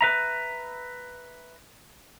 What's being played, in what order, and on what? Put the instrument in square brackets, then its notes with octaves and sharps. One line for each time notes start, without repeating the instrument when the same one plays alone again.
[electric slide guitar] B4 E5 A#5